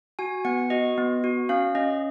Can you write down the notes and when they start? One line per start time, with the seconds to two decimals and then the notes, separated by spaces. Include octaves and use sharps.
0.19 F#4 G#5
0.45 B3 F#5
0.70 F#4 D#5
0.98 B3
1.24 F#4
1.49 C#4 F5
1.75 C#4 D#5